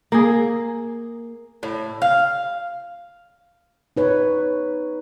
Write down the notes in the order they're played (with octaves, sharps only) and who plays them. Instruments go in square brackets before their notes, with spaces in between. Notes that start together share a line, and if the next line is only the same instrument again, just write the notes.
[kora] A#3 G#4
[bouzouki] A2
F5
[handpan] D#4 B4 C#5